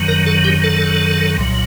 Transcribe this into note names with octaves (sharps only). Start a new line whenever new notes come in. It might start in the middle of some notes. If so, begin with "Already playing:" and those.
Already playing: F#2 D#3 F#3
A#4
A4
G4
A4
C2 A#2 F#3